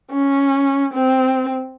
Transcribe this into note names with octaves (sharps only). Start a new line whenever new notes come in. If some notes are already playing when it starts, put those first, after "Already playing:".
C#4
C4